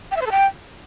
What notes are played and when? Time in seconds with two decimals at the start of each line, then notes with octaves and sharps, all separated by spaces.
0.11 G5
0.16 E5
0.21 C5
0.26 A4
0.31 G5